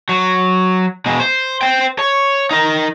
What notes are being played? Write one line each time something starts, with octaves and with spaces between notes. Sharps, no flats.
F#3
B2 G#3
C5
C5 G5
C#5
D#4 A#4